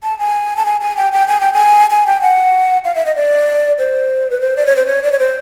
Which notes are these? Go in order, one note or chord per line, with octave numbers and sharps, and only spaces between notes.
A5
G#5
A5
G#5
G#5
G5
G5
G#5
G5
G#5
G#5
G5
F#5
F5
E5
D#5
D5
C5
B4
C5
D5
C#5
C5
C#5
D5
C#5
C5